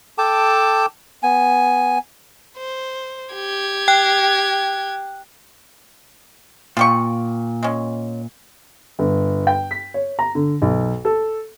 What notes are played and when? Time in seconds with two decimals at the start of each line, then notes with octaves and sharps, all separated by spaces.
0.18 A4 G5 A5 D6
1.23 B3 G#5
2.57 C5
3.34 G4 G#6
3.88 G5 F#6
6.77 A#2 F4 G4 C#6
7.63 G#3 C#4
8.99 G1
9.47 G5
9.71 B6
9.94 C#5
10.19 A#5
10.35 D3
10.62 B1
11.05 A4